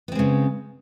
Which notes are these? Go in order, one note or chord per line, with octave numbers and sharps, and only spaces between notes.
C#3 G#3 B3 C4